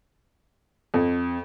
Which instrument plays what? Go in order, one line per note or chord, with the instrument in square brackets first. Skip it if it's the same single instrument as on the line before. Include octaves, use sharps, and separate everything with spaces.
[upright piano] F2